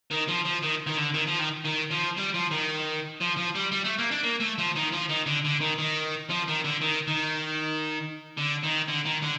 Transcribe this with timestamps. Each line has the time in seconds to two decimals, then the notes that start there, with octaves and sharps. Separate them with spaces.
0.11 D#3
0.28 F3
0.46 F3
0.63 D#3
0.87 D#3
0.97 D3
1.14 D#3
1.27 F3
1.39 D#3
1.65 D#3
1.91 F3
2.17 G3
2.34 F3
2.51 D#3
3.21 F3
3.37 F3
3.55 G3
3.72 G3
3.84 A3
3.98 A#3
4.11 D4
4.23 A#3
4.40 A3
4.58 F3
4.76 D#3
4.92 F3
5.09 D#3
5.26 D3
5.45 D3
5.61 D#3
5.78 D#3
6.30 F3
6.48 D#3
6.64 D3
6.81 D#3
7.07 D#3
8.37 D3
8.63 D#3
8.88 D3
9.05 D#3
9.22 D3